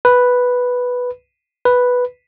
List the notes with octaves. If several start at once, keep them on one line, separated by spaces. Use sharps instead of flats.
B4
B4